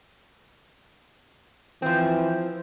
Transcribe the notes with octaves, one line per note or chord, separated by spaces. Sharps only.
E3 F3 C4